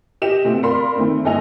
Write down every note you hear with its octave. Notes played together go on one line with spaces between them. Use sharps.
G4 D#5 G5 E7
B2 A3 C4
A#4 D5 F5 B5 C6
D#3 A3 C4
G1 A4 D#5 G#5 F7